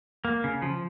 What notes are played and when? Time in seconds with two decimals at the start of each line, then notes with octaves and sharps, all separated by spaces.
0.25 A#3
0.44 C#3
0.62 F3